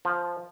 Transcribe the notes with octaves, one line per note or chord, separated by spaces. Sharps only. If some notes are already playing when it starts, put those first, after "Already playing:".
F3